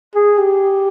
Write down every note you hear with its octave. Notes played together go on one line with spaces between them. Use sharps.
G#4
G4